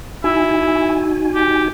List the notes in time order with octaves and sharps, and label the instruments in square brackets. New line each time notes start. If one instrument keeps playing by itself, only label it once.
[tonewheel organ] D#4 F#4 G#5 [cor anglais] E4
[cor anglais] G4